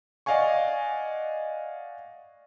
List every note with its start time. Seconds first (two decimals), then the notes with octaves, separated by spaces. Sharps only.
0.26 D5 D#5 F5 F#5 G#5 C#6